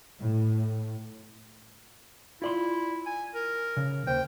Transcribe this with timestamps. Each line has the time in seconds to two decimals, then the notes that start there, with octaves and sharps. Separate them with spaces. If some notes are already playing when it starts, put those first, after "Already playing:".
0.19 A2
2.42 E4 F4 D5 C6
3.06 G#5
3.34 A#4
3.77 C#3
4.07 D#2 C5 G5